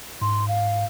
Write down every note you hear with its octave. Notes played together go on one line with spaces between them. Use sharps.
G#2 C6
F5